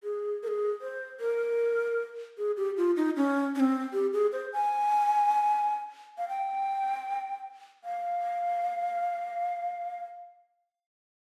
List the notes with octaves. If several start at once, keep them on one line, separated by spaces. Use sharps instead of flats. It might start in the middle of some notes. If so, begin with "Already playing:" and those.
G#4
A#4
G#4
C5
A#4
G#4
G4
F4
D#4
C#4
C#4
C4
G4
G#4
C5
G#5
F5
G5
F5